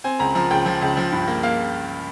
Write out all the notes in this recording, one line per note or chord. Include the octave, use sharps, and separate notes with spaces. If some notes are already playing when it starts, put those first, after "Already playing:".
C4 G#5
C#2 A#5
F3 A#5
C#2 G5
F3
C#2
F3
G2
A#3
A#3 F5